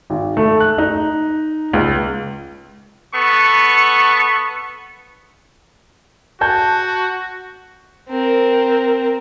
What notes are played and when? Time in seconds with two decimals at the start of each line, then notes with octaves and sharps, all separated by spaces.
0.10 G#1
0.37 A3
0.60 F#6
0.78 D#4
1.73 C#2
3.14 B3 A4 C#6
6.41 F#4 A5 G6
8.10 C4 A#4